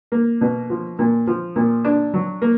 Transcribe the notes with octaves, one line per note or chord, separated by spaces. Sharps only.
A#3
B2
F3
A#2
F3
A#2
D4
F#3
A#3